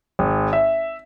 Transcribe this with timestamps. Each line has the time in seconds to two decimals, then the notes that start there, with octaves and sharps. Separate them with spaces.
0.19 G#1
0.53 E5